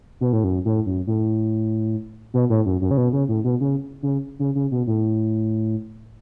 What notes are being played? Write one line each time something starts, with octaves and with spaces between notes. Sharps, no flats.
B2
A2
F#2
A2
F#2
A2
B2
A2
F#2
F#2
C#3
B2
C#3
A2
B2
C#3
C#3
C#3
C#3
B2
A2